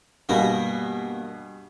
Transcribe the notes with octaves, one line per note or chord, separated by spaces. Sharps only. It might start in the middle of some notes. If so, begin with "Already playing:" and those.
G2 B2 A#3 B3 G#4 A#4